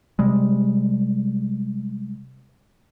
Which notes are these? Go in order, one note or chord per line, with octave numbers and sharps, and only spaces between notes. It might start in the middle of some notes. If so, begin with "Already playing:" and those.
C3 G3 G#3